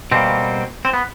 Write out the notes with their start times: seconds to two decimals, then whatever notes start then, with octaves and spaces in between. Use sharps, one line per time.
0.12 B2 G3 A#3 C4
0.85 C4
0.93 B3